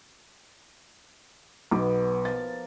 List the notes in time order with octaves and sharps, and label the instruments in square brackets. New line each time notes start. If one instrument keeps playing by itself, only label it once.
[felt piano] B1 D6 [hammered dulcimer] B3
[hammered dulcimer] F3 A#4 [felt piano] A6